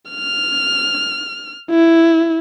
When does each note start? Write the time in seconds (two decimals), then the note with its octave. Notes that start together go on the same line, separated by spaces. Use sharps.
0.10 F6
1.70 E4